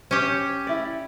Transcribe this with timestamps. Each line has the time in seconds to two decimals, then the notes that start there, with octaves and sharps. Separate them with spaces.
0.11 C#4 G4
0.67 E4 D5